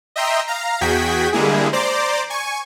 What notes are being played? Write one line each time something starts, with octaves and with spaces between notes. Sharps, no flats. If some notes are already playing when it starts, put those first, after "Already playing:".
D#5 E5 G5 A#5 C6
F5 A#5
E2 F#4 G#4 G5 G#6 B6
D3 G3 G#3 A#3 E4 G#4
C5 D5 A#5 C6 D6
G#5 C#6